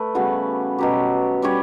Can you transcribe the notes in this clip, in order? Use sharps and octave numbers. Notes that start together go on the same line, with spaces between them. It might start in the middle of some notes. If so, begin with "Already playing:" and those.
Already playing: A3 B4
C#3 G3 B3 F#4
B2 F#3 C#4 G4
G3 C#4 G4 C#5